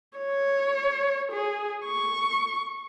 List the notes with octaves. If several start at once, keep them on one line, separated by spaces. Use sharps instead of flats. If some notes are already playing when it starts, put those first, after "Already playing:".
C#5
G#4
C#6